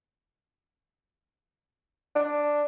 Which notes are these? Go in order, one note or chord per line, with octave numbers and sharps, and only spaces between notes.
D4